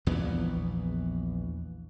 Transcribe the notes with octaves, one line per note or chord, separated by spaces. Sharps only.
A#1 E2 E3 B3